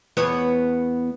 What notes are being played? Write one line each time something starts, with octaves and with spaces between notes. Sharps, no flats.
E2 B3 C#5